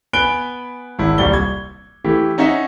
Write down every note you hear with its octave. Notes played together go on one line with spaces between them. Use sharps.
B3 G#5 B5 F#6 D7 G7
G#1 E4
D#1 C2 G3 G7
G#6
E3 A3 E4 G4
C#4 D#4 C#5 D#5 E5 F#5